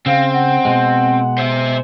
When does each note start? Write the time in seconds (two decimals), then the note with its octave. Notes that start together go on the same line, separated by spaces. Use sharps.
0.06 C#3 C4 F5
0.33 F#5
0.65 B2 G#3
1.38 C5 E5